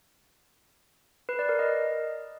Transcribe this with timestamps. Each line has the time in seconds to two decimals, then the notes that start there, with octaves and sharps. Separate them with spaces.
1.29 B4
1.39 D5
1.49 A#4
1.59 D#5